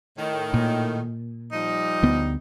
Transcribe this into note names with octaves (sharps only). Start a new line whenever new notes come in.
A2 D#3
A#2
F3 G3 D#4
D2 B3